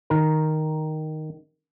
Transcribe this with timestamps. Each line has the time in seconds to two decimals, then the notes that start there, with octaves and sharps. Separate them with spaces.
0.10 D#3 A#4